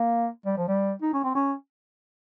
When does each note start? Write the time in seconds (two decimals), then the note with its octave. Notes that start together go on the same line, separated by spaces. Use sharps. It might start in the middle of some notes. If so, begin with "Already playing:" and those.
Already playing: A#3
0.46 G3
0.57 F3
0.68 G3
1.02 D#4
1.13 C#4
1.24 C4
1.35 C#4